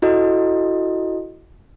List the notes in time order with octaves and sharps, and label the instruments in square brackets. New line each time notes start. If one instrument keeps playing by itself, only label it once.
[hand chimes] E4 F#4 A4 D#5